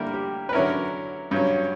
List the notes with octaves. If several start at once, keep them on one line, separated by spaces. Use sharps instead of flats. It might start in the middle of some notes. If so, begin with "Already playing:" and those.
Already playing: D3 G3 A#3 E4 A#4
G4
B4
D3 F#3 C#4 E4 A#4
G2 F#3 C#4